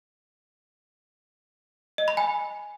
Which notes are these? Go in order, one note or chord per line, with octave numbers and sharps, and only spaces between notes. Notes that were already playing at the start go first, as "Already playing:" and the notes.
D#5
B5
G#5